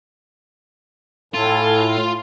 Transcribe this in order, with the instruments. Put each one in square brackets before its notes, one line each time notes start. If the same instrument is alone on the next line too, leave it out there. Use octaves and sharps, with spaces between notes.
[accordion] A2 [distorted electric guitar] F4 [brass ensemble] A4 G#5